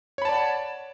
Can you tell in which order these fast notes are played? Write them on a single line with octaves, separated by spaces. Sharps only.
C#5 B5 A5 D5 F#5